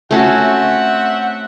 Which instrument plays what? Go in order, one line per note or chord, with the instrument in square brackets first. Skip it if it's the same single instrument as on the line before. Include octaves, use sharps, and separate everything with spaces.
[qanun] A3 C#4 F#4 [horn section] C4 E5 F#5